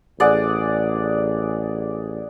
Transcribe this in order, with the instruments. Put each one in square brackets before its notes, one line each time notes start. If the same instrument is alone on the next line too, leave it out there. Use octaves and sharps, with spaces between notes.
[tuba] A1 [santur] G#4 D5 F#5